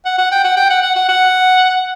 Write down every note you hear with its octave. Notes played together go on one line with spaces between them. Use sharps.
F#5
F#5
G5
F#5
G5
F#5
F#5
F#5
F#5